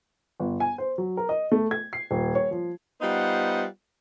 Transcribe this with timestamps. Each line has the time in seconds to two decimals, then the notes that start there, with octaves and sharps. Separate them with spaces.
0.40 G1
0.60 G#5
0.78 C5
0.98 F#3
1.17 A#4
1.29 D#5
1.52 A3
1.71 G#6
1.93 C7
2.11 D#1
2.35 C#5
2.51 F3
3.02 G3 B3 D#4 F4 C5 F#5